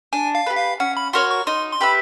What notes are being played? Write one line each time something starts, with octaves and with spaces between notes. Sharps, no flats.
D4 G#5
F5
G4 B4
F5
C#4 F#5
B5
F#4 A#4 C#5 C6
C#6
D#4 C6
C6
G4 B4 E5 B5